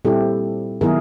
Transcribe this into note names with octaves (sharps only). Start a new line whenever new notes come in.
A#2 G3 C4 E4 G4 A4
D#3 F#3 B3 E4 G#4 A#4